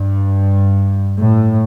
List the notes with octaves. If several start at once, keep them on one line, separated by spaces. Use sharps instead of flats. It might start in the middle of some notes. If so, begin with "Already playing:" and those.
Already playing: G2
A2